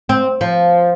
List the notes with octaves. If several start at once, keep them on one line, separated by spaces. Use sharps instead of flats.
C4
F3